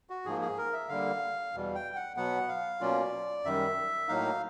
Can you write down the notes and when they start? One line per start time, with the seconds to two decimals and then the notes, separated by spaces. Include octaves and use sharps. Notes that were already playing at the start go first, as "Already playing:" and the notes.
0.10 F#4
0.25 G#2 F3 A#3 G#4
0.41 G#4
0.58 A#4
0.73 E5
0.89 D3 G3 A#3 F5
1.53 E2 B2 G3
1.75 G5
1.96 F#5
2.17 B2 F#3 B3 F#5
2.49 F5
2.80 B2 F#3 A#3 C#4 F4 D5
3.44 F#2 D#3 G3 E5
4.08 A2 F#3 A#3 D#4 F5